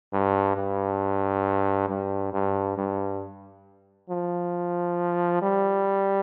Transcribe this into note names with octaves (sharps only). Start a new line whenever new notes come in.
G2
G2
G2
G2
G2
F3
G3